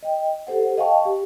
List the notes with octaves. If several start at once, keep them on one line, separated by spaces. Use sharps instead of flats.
D#5 G5
G4 A4 C5 F#5
D#5 F5 G5 A5 C#6
G4